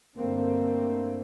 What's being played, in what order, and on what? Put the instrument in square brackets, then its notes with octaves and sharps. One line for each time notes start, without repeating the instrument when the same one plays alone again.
[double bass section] G2 D3 A3 C4 [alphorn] A#3